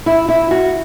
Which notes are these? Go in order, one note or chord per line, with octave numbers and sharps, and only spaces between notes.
E4
E4
F#4